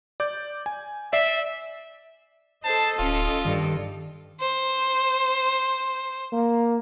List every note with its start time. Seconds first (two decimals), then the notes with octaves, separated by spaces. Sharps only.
0.20 D5 D6 G6
0.66 G#5
1.13 D5 E5 C7 E7
2.65 A4 C5 D#5 A5
2.99 D1 C#4 F4
3.45 G2 D#3
4.40 C5
6.33 A#3